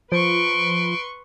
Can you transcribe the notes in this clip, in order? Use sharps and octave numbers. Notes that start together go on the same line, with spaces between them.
F3 B4 C6 C#6 D7